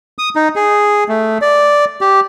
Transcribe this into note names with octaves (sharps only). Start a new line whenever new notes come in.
D#6
D#4
G#4
A3
D5
G4